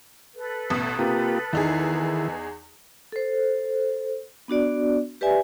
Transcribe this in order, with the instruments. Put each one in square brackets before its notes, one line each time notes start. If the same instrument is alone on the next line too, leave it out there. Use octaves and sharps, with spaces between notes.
[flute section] A4 B4
[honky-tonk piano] A1 B2 D#6
[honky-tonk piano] C3 [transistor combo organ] A#3 F4 G4
[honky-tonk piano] E2 D#4 G#4 [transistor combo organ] D#3 E4
[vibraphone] A4 C5
B3 D4 F#4 D5
G4 B4 D5 E5 G#5